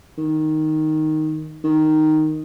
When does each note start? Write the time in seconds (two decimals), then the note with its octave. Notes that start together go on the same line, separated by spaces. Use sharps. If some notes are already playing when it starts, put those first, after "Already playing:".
0.18 D#3
1.64 D#3